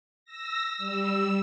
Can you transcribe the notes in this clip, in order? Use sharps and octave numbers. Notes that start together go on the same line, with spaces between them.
E6 A#6
G3 E6